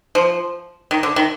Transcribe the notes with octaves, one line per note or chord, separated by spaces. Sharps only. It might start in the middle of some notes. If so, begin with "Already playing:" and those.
F3
D#3
D3
D#3